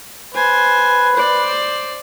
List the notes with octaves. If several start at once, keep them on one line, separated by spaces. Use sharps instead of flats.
B4 C5 G#5
C5 D5